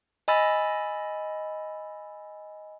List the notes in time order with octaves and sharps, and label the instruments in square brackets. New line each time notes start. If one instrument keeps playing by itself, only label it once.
[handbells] D#5 G#5 B5 E6 A6